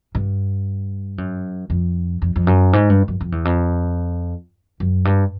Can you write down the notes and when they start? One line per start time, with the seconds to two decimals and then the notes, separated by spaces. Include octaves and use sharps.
0.15 G2
1.18 F#2
1.70 F2
2.22 F2
2.36 F2
2.47 F#2
2.73 G#2
2.90 G2
3.08 F#2
3.21 F2
3.32 E2
3.45 F2
4.80 F#2
5.05 G2